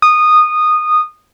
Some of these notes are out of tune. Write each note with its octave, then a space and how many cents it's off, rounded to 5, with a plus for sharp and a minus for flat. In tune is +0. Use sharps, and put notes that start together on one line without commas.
D#6 -15